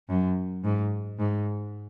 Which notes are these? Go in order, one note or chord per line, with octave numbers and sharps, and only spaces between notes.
F#2
G#2
G#2